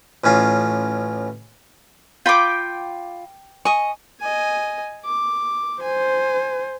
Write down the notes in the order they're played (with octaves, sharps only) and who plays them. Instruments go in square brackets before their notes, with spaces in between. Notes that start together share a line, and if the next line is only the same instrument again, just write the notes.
[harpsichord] A1 A2 C#4 F4
[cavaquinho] F4 B5 [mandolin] G5 D6
[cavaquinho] D#5 C#6 [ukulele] G#5
[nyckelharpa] D#5 G#5
D6
[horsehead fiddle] C5 [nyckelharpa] G#5